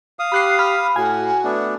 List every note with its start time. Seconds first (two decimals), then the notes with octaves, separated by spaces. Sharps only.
0.19 F5 D#6
0.32 G4 B5 F#6 C7
0.59 B5 F6
0.96 A2 F#4 G#5
1.44 A3 B3 D4